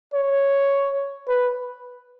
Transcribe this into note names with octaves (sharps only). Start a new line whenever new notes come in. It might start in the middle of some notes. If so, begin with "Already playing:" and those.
C#5
B4